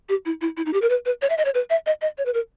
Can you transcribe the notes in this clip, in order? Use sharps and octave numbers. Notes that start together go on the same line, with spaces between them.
G4
E4
E4
E4
D#4
G4
A#4
B4
B4
C#5
E5
D#5
C#5
B4
E5
D#5
D#5
C#5
B4
A#4